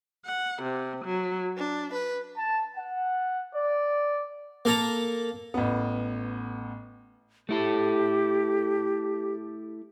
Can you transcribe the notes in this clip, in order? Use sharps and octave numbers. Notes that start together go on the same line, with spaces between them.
F#5
C3
F#3
D4
B4
A5
F#5
D5
A#3 A4 A#5
A1 B3
A3 E4 G4 A4